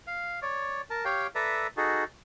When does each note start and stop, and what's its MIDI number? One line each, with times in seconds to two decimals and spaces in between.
0.07 0.40 77
0.42 0.81 73
0.42 0.81 74
0.90 1.05 70
0.90 1.05 81
1.05 1.27 67
1.05 1.27 73
1.05 1.27 77
1.05 1.27 79
1.35 1.67 69
1.35 1.67 71
1.35 1.67 74
1.35 1.67 76
1.35 1.67 82
1.77 2.04 63
1.77 2.04 66
1.77 2.04 68
1.77 2.04 69